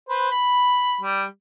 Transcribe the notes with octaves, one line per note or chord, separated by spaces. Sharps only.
B4 C5
B5
G3